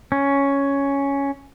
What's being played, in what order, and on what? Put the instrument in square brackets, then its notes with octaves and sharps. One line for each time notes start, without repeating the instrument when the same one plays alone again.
[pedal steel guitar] C#4